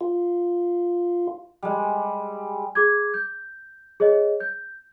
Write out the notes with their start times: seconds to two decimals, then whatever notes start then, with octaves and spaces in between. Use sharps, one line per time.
0.01 F4
1.63 G3 G#3
2.75 G#4 D6 G#6
3.14 G6
4.00 G#4 C#5 D#5
4.40 G6